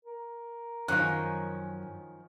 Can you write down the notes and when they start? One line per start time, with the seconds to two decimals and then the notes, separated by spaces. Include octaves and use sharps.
0.05 A#4
0.88 F#2 D#3 F3 C#4 F#6